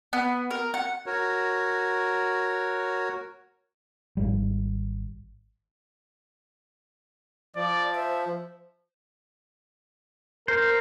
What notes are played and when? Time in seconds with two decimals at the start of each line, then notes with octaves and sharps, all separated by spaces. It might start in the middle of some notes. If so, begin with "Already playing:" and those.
0.13 B3
0.51 A#4
0.74 F#5
1.06 F#4 A#4 C#5
4.17 G#1 G3
7.56 F3 D5
7.95 C5 E5
10.48 A#4 C5